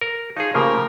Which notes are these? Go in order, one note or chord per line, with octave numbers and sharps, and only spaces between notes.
A#4
F3 D#4 F4 G#4 C#5
C#3 F3 A3 A#3 G4 A#4